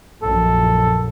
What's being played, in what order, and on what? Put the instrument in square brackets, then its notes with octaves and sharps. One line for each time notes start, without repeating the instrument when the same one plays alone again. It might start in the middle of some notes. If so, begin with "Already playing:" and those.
[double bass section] A#1 F#2 [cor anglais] A4